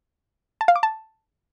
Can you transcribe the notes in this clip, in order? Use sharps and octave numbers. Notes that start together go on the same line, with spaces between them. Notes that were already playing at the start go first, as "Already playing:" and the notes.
A5
F5
D6
A5